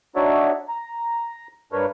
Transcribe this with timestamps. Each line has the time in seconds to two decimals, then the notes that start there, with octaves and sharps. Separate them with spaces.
0.16 D4 D#4 F#4 C#5 D5 E5
0.68 A#5
1.72 G2 D4 A#4 B4 C#5